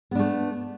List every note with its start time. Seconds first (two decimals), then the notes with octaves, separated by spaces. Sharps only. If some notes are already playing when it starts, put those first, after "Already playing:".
0.11 B3
0.15 D4
0.19 A3